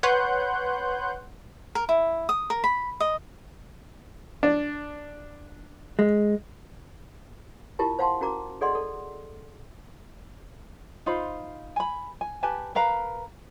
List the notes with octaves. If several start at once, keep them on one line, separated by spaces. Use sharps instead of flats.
B4 C#5 F#5 C6 F#6 G6
A#4
E4
D#6
A#4
B5
D#5
D4
G#3
E4 F4 G4 A#4 A5
C5 F5 F#5 A5 C6
C#4 F#4 A#4 A#5 D6
G#4 A4 D5 D#5 F#5 C6
A4
D#4 F4 C5 B5
G#5 B5
G#5
G4 B4 G#5 A5
A#4 B4 F5 A#5